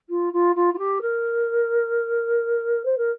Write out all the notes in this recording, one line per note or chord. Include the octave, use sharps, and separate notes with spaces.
F4
F4
F4
F4
G4
A#4
C5
A#4